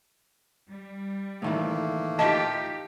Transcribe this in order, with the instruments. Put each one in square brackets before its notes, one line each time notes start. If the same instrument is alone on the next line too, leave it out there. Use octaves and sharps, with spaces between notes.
[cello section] G3
[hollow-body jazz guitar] A2 D#3 E3 [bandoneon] A3 A#3
[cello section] D#4 F4 G4 [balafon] D#5 A5